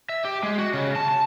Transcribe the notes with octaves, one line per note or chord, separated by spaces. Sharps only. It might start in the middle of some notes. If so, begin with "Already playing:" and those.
E5
G4
G#3
F#4
C#3
A5
A5